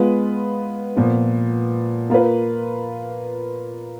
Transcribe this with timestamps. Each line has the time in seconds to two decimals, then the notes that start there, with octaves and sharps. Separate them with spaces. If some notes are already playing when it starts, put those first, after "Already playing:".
Already playing: G#3 B3 F4 B4
0.96 A#2 F3 B3
2.10 A#3 F4 B4